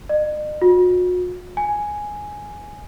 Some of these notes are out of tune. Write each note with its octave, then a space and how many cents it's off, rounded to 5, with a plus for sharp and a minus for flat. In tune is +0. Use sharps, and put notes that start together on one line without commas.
D#5 -45
F#4 -40
G#5 +0